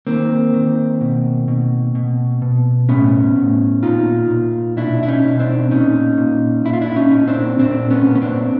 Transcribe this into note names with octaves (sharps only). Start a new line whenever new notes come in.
D#3 A#3 C4
D#3
B2
B2
B2
B2
A2 B3 C#4
A2
A#2 D#4 F4
A#2
B2 D4 E4
E4
C#4 D#4
B2
C4 D4
A#2 C#4 D#4
A#2
A#2 E4
F4
D4 E4
C#4 D#4
A#2
C4 D4
A#2 C4 D4
B3 C#4
A#2
C#4
C4 D4